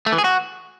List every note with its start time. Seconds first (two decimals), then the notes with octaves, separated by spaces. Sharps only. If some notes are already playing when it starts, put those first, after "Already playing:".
0.06 A3
0.12 E3
0.18 G#4
0.24 F#4